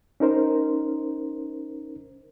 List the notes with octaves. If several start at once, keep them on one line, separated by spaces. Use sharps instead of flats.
C#4 D#4 A#4 C5